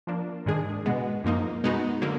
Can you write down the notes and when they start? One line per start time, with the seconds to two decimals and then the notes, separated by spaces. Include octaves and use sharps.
0.07 F3 A#3 D4
0.46 G#2 D#3 G#3 D4 G#4
0.86 B2 G#3 B3
1.24 F#2 F3 A#3 D#4
1.64 B2 G#3 B3 D#4 F#4
2.02 D3 F#3 A#3